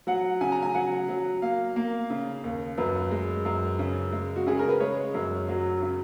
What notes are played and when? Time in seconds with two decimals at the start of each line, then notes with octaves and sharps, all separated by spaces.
0.07 F#3 F#5
0.41 C#3 G#5
0.52 A#5
0.62 G#5
0.75 F#3 F#5
1.09 F#3
1.42 A#3 F5
1.76 A#3
2.10 C#3
2.44 D#2
2.78 F#2 B4
3.11 G#3
3.45 F#2
3.79 C#3
4.12 G#3
4.36 F#4
4.47 C#3 G#4
4.59 A#4
4.69 B4
4.80 G#3 C#5
5.14 F#2
5.48 F#3
5.82 C#3